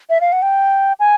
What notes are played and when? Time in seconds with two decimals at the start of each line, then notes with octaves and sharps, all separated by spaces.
0.10 E5
0.21 F5
0.32 F#5
0.42 G5
1.00 G#5